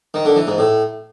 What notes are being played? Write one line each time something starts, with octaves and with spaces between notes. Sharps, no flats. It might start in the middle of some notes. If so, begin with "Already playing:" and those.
D#3
D3
E3
G#2
A2